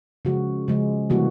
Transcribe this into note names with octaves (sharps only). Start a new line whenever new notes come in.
C#3 F3 G#3 F#4
C#3 F3 G#3
C3 E3 G3 A#3 F#4